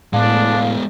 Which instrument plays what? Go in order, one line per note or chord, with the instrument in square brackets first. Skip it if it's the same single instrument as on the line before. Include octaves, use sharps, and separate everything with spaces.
[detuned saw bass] A2 [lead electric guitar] G#3 B3 [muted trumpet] D4 [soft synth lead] F5